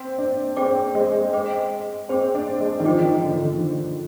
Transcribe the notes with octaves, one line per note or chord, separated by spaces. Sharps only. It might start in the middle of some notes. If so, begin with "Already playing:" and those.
Already playing: C4
D4
C4 G#4 C5 G5 D6
G#3
G#4 C5 G5 D6
C4 G#4 C5 G5 D6
D4
G#3
D#3
F3 C5 D#5 G5 D6
D#3
D3
D3